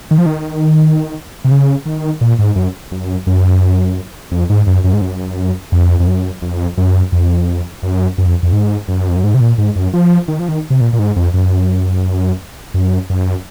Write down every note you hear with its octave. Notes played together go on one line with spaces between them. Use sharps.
D#3
F3
D#3
C3
C#3
D#3
A#2
G#2
F#2
F#2
F#2
F2
G#2
F#2
F#2
G#2
F#2
F2
F2
F#2
F2
F#2
F2
F#2
F#2
F2
F2
G#2
F#2
F2
F#2
G#2
C3
A#2
G#2
F#2
F3
D#3
F3
D#3
C3
A#2
A#2
G#2
F2
F#2
F#2
F#2